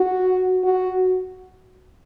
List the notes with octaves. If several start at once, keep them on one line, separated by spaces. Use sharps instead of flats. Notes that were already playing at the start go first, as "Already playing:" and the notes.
Already playing: F#4
F#4